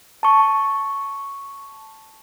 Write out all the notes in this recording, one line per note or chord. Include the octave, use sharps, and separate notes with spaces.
A5 C#6